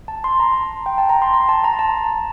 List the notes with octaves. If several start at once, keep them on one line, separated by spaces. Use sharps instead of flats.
A5
C6
A#5
G5
A5
A#5
C6
A#5
A5
A#5
A5